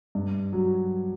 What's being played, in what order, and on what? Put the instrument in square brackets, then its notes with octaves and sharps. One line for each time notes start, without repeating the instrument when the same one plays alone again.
[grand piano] G2
F#3